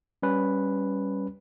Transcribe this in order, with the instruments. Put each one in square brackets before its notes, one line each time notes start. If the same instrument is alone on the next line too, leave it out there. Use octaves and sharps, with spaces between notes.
[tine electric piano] G3 C#4 B4